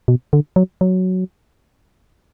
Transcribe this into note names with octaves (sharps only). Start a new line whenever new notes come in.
B2
D3
F#3
F#3